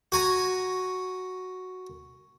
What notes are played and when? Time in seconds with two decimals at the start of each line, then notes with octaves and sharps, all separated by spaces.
0.12 F#4 G#5 A#5